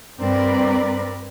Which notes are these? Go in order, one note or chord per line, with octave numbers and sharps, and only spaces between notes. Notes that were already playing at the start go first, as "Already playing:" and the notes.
G2 C4 A#4 B4 D5